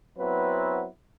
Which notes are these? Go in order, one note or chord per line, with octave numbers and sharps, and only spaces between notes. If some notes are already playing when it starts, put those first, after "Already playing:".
F#3 B3 C4 E4 B4